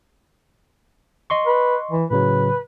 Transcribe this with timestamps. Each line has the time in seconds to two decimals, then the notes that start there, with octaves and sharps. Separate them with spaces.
1.30 D#5 C6 C#6
1.46 B4
1.91 E3
2.10 A2 C#3 F#3 B4